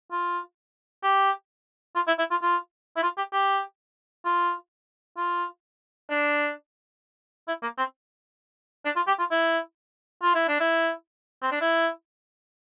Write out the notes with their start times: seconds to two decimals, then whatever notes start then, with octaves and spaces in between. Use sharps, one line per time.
0.11 F4
1.03 G4
1.95 F4
2.07 E4
2.18 E4
2.31 F4
2.42 F4
2.96 E4
3.03 F4
3.18 G4
3.33 G4
4.25 F4
5.17 F4
6.10 D4
7.48 E4
7.62 A#3
7.78 C4
8.85 D4
8.96 F4
9.07 G4
9.19 F4
9.31 E4
10.22 F4
10.35 E4
10.48 D4
10.60 E4
11.42 C4
11.52 D4
11.61 E4